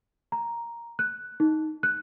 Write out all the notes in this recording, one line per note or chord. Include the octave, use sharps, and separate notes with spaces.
A#5
F#6
D#4
F#6